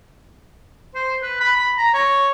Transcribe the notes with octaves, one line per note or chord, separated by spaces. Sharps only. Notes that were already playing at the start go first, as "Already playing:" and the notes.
C5
B4
B5
B5
A#5
C#5